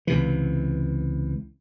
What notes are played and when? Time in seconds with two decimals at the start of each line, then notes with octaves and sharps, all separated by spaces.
0.07 C#2 C3 E3